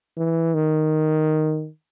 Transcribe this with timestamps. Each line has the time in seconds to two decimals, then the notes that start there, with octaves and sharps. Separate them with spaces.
0.18 E3
0.54 D#3